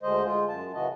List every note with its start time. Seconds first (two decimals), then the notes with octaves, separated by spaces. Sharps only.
0.03 D2 D3 G#3 C5 D#5
0.24 G#3 F4
0.48 F#2 A5
0.74 F#2 C#3 E3 F#4 D#5